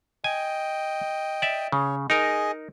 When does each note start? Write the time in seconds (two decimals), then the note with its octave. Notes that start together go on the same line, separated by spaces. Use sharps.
0.24 D#5 G5 G#5
1.42 D5 E5
1.72 C#3 C#5
2.10 D#4 G#4 A#4 D#5